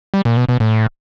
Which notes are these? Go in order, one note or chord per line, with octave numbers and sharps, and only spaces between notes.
G3
A#2
B2
B2
A2